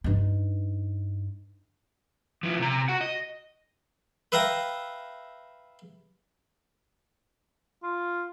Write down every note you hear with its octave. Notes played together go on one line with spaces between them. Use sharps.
G2 D#4
F3 E4
C3 A#5
F#4 F#5
D#5
B4 E5 F5 G5 A#5
F4